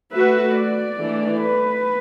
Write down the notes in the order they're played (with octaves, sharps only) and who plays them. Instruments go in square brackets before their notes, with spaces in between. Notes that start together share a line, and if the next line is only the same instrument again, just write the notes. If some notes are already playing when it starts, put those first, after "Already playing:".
[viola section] A3 F#4 B4 [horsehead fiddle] E5
[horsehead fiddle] D5
[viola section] E3 A3 D4
[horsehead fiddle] B4